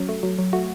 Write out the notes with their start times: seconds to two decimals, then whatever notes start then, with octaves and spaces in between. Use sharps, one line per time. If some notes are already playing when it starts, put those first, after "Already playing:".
Already playing: F#3 C#4
0.09 A3
0.23 F#3
0.38 F#3
0.53 A3 F#4